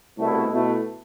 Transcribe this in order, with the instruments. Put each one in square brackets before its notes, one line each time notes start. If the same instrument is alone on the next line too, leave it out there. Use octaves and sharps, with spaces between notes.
[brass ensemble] C2 B2 A3 E4
B2 A3 E4